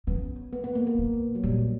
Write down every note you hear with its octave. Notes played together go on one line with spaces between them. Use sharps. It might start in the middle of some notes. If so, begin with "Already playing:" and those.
C#3 B3
B3
B3
A#3
A#3
B2
F#3
A#2 G3